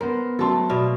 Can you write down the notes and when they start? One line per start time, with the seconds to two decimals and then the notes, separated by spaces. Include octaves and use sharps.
0.01 B3 A#4 C5
0.39 F#3 A3 A4 A5 C6
0.69 B2 D5 E5 F5